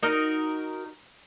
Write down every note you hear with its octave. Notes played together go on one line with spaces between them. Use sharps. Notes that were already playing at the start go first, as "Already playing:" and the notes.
D#4 F#4 A#4